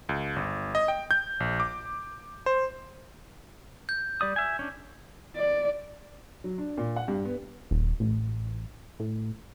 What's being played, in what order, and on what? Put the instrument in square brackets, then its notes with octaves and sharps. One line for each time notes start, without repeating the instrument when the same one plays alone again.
[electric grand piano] C#2
G1
D#5
G5
G6
A#1
D6
C5
[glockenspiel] G6
[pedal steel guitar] G3 D5 D#6
E5 G#5
C#4 D4
[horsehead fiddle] D5
[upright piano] F#3
D4
A#2
F#5
G2
B3
[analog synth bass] D#1
A1
A2